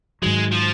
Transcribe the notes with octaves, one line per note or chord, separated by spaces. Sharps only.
G#2 D#3 F#3 G#3
F3